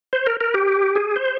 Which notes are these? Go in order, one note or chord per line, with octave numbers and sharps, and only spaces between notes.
C5
A#4
A#4
G4
G#4
C5